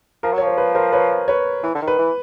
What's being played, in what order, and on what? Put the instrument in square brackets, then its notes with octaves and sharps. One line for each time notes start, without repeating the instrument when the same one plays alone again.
[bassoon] F3 [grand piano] A#4
[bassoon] F#3
[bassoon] F3 [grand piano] C#5
[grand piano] C5
B4
A#4 C5
B4 C#5
B4 C#5
[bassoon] E3
D3
D#3
[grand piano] B4
[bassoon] E3